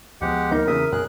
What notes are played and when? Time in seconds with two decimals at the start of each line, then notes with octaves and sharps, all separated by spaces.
0.21 D2 F3 G#3 B3 G4 F#5
0.51 D#2 D#4 A#4
0.67 E2 C#3 E5 D#6
0.92 B1 F#2 G#4 F#6